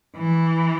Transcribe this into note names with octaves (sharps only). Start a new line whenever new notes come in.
E3